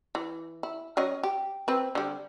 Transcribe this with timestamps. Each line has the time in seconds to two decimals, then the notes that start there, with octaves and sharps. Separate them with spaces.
0.15 E3
0.63 E4
0.97 F#3 C#4 D#5
1.23 G4
1.68 C4 B4
1.95 D3 G3